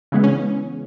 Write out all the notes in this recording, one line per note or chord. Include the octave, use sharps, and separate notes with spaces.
C#3 E3 G#3 B3
C#4